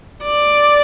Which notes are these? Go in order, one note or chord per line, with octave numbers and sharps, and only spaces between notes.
D5